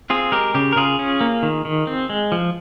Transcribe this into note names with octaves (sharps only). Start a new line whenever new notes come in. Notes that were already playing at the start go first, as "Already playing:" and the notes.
C4 F4 G#4
G#3 G4 A#4
C#3 G4
A#4
C#3 F4 G#4
C#4
A#3
D#3
D#3
C4
G#3
F3